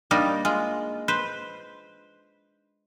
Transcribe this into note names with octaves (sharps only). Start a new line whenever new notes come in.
G3 A#3 D4 D#4
G#3 F4
B4 C5